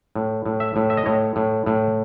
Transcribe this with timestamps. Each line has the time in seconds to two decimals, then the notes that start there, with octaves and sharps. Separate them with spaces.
0.16 A2
0.46 A2
0.60 E5
0.76 A2
0.90 E5
0.97 D#5
1.06 A2 C#5
1.36 A2
1.66 A2